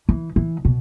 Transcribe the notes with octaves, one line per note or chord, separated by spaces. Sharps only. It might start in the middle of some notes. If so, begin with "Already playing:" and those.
E3
E3
B2